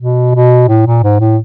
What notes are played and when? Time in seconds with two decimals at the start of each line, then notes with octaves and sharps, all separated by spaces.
0.01 B2
0.35 B2
0.69 A2
0.86 A#2
1.03 G#2
1.20 A2